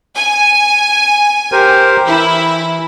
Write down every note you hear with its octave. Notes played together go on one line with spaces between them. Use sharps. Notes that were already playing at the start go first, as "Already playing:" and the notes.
G#5
G4 A#4 C5
E3 E4